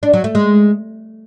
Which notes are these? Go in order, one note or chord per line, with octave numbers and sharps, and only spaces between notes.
D4
F#3
A3
G#3